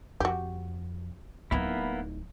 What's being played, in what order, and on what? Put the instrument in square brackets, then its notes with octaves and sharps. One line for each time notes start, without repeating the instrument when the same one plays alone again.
[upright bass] F2 [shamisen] F#4 G4
[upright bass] D1 D#4 [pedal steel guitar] A#3 B3 E4